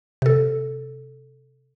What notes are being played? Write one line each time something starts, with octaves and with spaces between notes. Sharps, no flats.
C3 A4